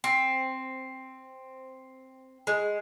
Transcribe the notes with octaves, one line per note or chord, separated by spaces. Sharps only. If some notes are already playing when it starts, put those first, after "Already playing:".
C4
G#3